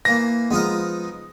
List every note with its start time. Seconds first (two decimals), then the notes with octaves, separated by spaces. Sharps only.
0.05 E3 A#3 A#6
0.51 F3 G#3 B3 D#4 A#4